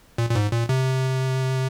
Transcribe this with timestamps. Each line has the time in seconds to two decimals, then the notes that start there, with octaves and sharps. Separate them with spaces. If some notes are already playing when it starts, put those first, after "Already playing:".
0.18 A#2
0.29 A#2
0.35 G#2
0.52 A#2
0.69 C3